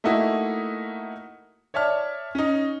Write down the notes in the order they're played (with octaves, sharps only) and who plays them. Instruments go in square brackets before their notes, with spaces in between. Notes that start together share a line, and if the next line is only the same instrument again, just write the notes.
[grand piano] A3 A#3 D#4 E4 F#4
C#5 D5 E5 A5 F6
C#4 D#4